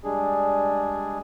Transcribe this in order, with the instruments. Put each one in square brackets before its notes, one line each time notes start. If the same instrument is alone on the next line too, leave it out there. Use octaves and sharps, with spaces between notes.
[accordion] G3 G#3 D4 G#4